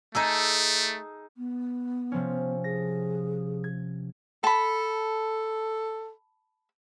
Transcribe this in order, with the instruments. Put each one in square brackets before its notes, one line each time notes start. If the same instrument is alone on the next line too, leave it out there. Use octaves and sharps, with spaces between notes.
[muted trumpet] A3 [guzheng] D#4 G#4 A4
[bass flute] B3
[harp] C3 F3 C#4
[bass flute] G#4 [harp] A#6
[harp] G#6
[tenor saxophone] A4 [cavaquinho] A5 B5